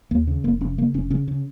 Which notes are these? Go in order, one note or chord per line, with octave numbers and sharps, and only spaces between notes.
D#2 A#3
C#3
F1 A#3
F1 C#4
C#3 A#3
F1 C#4
C#3 C#4
C#3